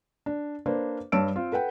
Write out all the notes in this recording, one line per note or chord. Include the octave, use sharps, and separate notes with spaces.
D4
A#3 D4 B4 C5
G2 G3 C#5 A5 E6 D7
C4 F4
A4 B4 F#5 G5